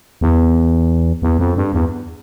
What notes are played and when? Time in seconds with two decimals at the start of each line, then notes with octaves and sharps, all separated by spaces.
0.21 E2
1.22 E2
1.39 F2
1.56 G2
1.74 E2